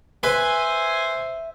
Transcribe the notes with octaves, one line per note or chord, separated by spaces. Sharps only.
B4 C5 E5 G#5